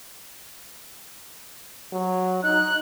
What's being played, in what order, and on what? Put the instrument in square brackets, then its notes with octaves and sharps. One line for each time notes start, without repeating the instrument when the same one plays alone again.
[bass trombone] F#3
[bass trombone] D#4 [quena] F#6